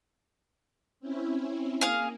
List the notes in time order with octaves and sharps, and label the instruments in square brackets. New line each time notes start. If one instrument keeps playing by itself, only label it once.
[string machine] C4 C#4 E4
[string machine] A#3 [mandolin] G#4 F5